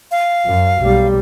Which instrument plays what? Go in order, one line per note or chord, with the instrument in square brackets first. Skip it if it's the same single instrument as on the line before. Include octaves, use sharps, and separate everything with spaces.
[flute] F5
[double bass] F#2
B1 G3